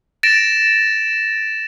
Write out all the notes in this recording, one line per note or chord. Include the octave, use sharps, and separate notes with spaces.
A6 A#6 D7 E7